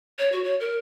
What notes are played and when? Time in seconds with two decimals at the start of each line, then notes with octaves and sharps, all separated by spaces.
0.18 C#5
0.32 F#4
0.44 C#5
0.60 A#4